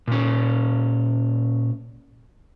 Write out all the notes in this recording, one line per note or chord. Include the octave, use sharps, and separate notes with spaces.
A#2 C#4